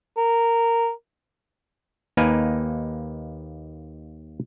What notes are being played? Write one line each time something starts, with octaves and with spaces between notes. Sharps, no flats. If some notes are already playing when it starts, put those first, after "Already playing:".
A#4
D#2 A#3 D#4 A#4 B4 G#5